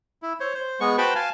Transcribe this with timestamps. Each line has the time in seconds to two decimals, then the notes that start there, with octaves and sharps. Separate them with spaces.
0.22 E4
0.40 C5 C#5
0.54 C5
0.80 G#3 B3 C#6
0.98 F#4 B4 C5 G5 A5 B5
1.15 F5 G#5 A5